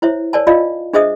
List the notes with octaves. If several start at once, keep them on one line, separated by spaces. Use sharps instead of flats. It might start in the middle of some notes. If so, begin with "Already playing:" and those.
E4 C5 C#5 E5
A#4 C#5 D5 G#5 A5
F4 D5 D#5 F5
D4 G#4 C5 D#5 E5 D#6